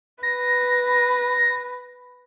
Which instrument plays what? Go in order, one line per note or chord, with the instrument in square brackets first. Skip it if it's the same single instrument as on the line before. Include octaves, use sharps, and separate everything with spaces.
[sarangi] B4 [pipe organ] A#6